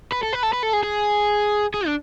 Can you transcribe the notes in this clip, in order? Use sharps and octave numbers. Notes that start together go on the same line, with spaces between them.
B4
A4
B4
A4
B4
A4
G#4
G#4
G#4
D4